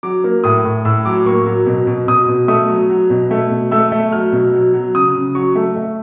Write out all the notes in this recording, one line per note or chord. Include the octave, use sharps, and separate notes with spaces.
F#3 D6
A#3
A2 D#6
A2
A2 E6
F#3 D6
A#3 C#6
F#3
B2
B2
B2 D#6
B2
A3 D#6
F#3
F#3
B2
A3
B2
A3 E6
A3
F#3 F6
B2
F#3
F#3
C#3 D#6
C#3
F#3 C#6
A3
A3